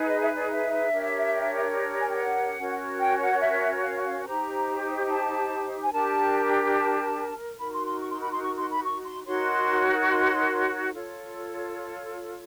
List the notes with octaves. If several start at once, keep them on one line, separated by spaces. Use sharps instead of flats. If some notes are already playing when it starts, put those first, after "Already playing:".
Already playing: D#4 G#4 B4
D#5
E5
D5
E5
D4 G4 A#4 C#5
G#5
G5
F#5
C#4 F#4 A#4 C#5
G5
F#5
E5
F5
F5
D#4 G4 C5 A#5
A5
G#5
D4 G4 A#4 A5
A5
D#4 F#4 A#4 B5
C6
C6
C#6
C6
B5
C6
C#6
C6
B5
C#6
C6
D#4 F#4 A#4 C#5 C6
C#6
C6
F4 A4 C#5